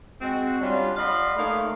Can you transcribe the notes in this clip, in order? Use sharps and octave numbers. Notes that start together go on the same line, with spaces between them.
G#3 C4 F#4
G3 C#4 D4 F4
D5 D#5 F5 F#5 B5 C6
A3 A#3 D#4 C#5 F5